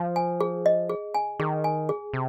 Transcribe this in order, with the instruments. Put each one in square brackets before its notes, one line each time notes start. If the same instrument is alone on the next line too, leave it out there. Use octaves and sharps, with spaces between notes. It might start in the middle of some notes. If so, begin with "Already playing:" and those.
Already playing: [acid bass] F3
[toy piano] G#5
G#4
D#5
G#4
G#5
[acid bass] D#3 [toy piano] G#4
[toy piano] G#5
G#4
[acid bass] C3